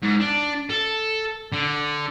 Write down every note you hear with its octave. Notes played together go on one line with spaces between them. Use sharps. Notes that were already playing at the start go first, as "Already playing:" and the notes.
G#2
D4
A4
D3